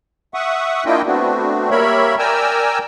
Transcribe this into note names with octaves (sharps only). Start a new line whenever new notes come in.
E5 F#5 C#6 D#6
A#3 D4 E4 F4 D#5 G5
A3 B3 C4 D4 F#4
G3 A#3 A#4 C#5 E5 B5
A#4 D5 G5 G#5 A#5 E6